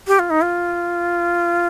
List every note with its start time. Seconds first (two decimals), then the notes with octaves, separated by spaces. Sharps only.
0.07 G4
0.19 F4
0.30 D#4
0.41 F4